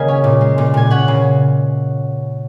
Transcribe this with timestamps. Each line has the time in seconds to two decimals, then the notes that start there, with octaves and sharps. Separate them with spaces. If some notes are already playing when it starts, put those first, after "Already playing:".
Already playing: C#3 A#3 G#4 A#4 D#5 G#5
0.08 C#4
0.24 A#2
0.41 G#3
0.58 A#2
0.74 A#2 G#5
0.90 C#4 F#5
1.08 C#3